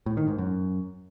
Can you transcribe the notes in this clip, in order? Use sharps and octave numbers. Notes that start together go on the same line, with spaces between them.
A2
D#3
G#2
F#2